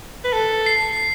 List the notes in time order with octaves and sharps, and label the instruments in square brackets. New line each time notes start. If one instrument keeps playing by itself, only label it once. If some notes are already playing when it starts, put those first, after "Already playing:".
[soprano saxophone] B4
A4
[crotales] C7